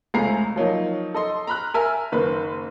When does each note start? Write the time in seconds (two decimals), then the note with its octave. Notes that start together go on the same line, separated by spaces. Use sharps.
0.14 F1 C#2 A3 G#5 A#5 C7
0.56 F3 F#3 A#3 D#4
1.14 A4 D#5 C6
1.47 A#5 B5 F6 F#6
1.74 A#4 E5 G#5 A5 E6 F6
2.12 F#1 D#3 B4